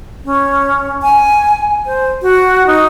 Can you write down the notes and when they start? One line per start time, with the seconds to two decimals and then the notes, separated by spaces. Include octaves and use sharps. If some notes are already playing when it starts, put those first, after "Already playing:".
0.25 C#4
1.03 G#5
1.86 C5
2.22 F#4
2.67 D#4